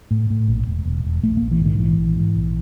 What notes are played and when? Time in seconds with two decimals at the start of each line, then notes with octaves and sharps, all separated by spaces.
0.11 A2
0.30 A2
0.48 A#1
0.67 E1
0.85 E1
1.04 E1
1.23 A#1 A3
1.37 A#1 A#3
1.51 E3
1.61 G#2 D#3
1.78 A#1 E3
1.97 A#1
2.16 G#2
2.35 A#1